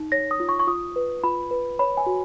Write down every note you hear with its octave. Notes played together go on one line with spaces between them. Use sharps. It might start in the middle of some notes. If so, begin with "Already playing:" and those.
Already playing: D#4
C#5 A#6
D#6
F4
C#6
C#6
F4 D#6
B4
F4 B5
B4
C#5 B5
G#5
F#4